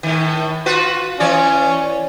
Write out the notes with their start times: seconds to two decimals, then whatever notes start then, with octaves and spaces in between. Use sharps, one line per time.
0.03 A2 D#3
0.66 F4 F#4 B4
1.20 E3 C#4 C#5 D5